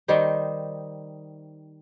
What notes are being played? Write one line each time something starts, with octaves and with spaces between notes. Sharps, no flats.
D#3 G3 D#4 C5